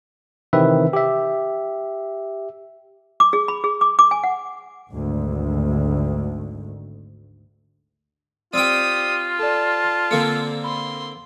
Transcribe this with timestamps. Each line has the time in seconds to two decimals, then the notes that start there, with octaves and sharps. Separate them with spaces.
0.53 C3 D#3 E3 C4 B4 E5
0.93 G4 E5
3.20 D6
3.33 G#4
3.48 B5
3.64 G#4
3.81 D6
3.99 D6
4.11 G#5
4.24 F#5
4.90 G#1 D2
8.54 C4 F4 G4 D5 G5 D#6 F6
9.39 A4 D5 A5
10.11 D3 A#3 C4 A4 C#7
10.64 B5 C6